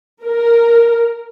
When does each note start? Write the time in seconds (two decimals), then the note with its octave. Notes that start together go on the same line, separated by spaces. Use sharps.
0.23 A#4